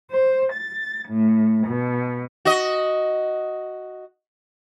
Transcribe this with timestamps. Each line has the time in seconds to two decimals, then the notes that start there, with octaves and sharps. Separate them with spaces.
0.11 C5
0.53 A6
1.08 A2
1.67 B2
2.45 F#4 D#5